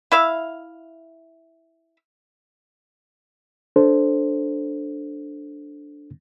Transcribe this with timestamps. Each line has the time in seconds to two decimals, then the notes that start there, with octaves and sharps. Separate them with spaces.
0.12 E4 E5 F5
3.76 D4 A4 C5